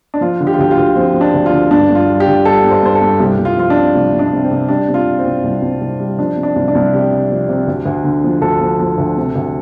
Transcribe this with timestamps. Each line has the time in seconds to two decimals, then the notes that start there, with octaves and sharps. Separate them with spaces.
0.14 D4
0.21 F3 F4
0.40 D3
0.47 G4
0.53 F4
0.59 D2 G4
0.71 F4
0.77 D2
0.96 F3 C4
1.14 F3
1.21 D4
1.34 D2
1.46 F4
1.52 D3
1.71 G2 D4
1.89 G2
1.95 F4
2.09 G3
2.20 G4
2.27 D3
2.45 G3 A4
2.64 G2
2.71 C5
2.83 G2 C5
2.95 A4
3.01 G2
3.20 C2 G4
3.38 C2
3.45 F4
3.57 F3 F4
3.70 D4
3.76 C3
3.95 C2
4.13 C2
4.19 D4
4.32 C3
4.44 C4
4.50 C3
4.69 G3 D4
4.88 C3
4.94 F4
5.06 C3
5.19 C4
5.25 C2
5.44 C2
5.62 C2
5.81 C2
6.00 G3
6.19 F3 D4
6.37 C3
6.43 D4
6.56 C2
6.68 D4
6.75 C2
6.93 C3 G4
7.12 C3
7.30 F3
7.49 C3
7.67 D2
7.86 D2
8.04 D3
8.24 F3
8.42 D2 A4
8.61 F3
8.80 F3
8.98 D2
9.17 C3
9.36 D2